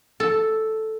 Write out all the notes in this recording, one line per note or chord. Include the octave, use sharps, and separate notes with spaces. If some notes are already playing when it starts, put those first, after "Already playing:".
A4